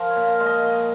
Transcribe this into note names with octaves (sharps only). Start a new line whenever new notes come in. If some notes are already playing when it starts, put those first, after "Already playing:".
Already playing: F3 A#4
C#5
A#2
F5
G#3
D#5
A#2